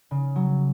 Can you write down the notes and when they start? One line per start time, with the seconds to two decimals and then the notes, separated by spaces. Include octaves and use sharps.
0.11 C#3
0.36 F#3